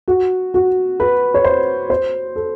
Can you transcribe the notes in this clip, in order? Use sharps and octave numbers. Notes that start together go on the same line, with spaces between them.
F#4
F#4
B4
C#5
C5
C5
A4